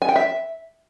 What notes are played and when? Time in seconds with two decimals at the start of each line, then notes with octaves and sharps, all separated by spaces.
0.02 G#5
0.09 G5
0.16 E5